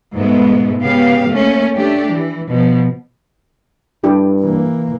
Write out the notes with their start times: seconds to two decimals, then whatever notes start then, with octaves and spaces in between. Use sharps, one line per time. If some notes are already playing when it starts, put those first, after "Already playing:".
0.14 G#2 B2 G#3 A3 B3
0.82 C#3 B3 G4 F5
1.28 A3 A#3 C#4
1.76 A3 D4 G4
2.11 E3
2.49 B2 F3
4.04 G2 D4 E4 G4
4.42 E3 A#3